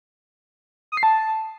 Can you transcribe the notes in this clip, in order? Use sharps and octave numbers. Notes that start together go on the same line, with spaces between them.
D#6
C7
A5